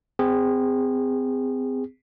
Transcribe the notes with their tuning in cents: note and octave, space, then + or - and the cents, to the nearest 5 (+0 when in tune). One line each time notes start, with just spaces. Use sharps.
C4 -30 G#4 -25